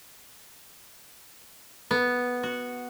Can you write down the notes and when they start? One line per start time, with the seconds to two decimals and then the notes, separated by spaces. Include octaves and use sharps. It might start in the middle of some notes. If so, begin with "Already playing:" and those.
1.91 B3
2.43 F#4